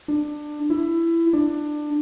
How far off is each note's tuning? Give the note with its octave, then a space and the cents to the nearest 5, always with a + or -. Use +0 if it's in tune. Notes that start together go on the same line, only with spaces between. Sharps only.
D4 +20
E4 +20
D4 +20